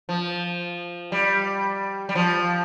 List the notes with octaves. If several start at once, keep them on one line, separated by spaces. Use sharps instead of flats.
F3
G3
G3
F3